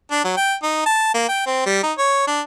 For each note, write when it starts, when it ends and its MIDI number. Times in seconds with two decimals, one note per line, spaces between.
0.11 0.23 62
0.24 0.36 54
0.37 0.54 79
0.63 0.84 63
0.86 1.14 81
1.14 1.25 58
1.29 1.46 79
1.46 1.61 60
1.66 1.83 55
1.83 1.92 63
1.98 2.24 73
2.27 2.41 62